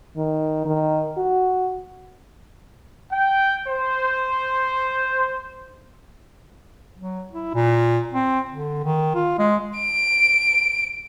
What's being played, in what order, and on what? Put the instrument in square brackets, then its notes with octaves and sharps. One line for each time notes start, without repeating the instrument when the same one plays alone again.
[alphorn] D#3
D#3
F#4
[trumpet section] G5
C5
[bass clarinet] F#3
E4
A#2
C4
D3
D#3
F4
G#3
[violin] D7